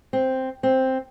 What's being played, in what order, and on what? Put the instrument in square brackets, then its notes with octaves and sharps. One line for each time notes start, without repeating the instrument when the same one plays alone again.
[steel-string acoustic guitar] C4
C4